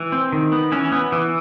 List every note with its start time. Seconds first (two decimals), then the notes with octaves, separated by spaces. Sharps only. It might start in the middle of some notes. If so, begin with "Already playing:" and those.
Already playing: E3
0.12 C4
0.32 D#3
0.52 B3
0.72 E3 C#4
0.92 B3
1.12 E3